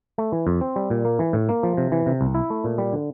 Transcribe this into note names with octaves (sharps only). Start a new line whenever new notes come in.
A3
E3
F2
C4
G3
A#2
A#3
E3
A2
A#3
F3
C3
E3
C3
C2
E4
A3
A#2
G3
D3